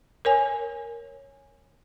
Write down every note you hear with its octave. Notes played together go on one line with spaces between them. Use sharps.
A#4 C#5 G#5